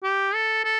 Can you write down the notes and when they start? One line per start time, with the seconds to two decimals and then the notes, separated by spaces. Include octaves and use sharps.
0.03 G4
0.34 A4
0.65 A4